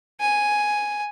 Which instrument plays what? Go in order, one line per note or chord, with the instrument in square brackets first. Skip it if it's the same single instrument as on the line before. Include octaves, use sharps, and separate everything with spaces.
[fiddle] G#5